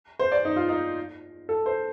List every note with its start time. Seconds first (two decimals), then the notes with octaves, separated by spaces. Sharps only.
0.19 C5
0.32 D5
0.45 D#4
0.56 F4
0.69 D#4
1.49 A4
1.66 C5